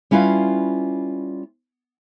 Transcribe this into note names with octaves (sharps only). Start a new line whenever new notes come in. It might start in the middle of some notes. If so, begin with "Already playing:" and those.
G3 C#4 E4 F4 B4 F5